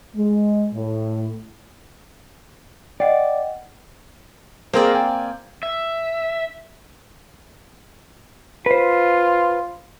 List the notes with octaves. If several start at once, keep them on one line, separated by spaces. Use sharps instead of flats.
G#3
A2
D5 D#5 F#5 G5
A#3 C4 G#4 A#4 C5 D5
G5 G#5
E5
F4 B4 C5